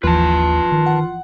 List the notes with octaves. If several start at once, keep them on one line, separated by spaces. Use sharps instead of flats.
G1 D#2 E3 F3 F4 B4 A5
D#3
F#5